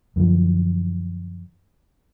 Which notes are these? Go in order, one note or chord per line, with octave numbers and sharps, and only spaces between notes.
F#2 D3 E3 F3